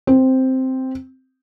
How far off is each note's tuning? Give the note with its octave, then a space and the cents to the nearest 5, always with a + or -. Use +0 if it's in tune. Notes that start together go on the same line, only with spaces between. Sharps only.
C4 +0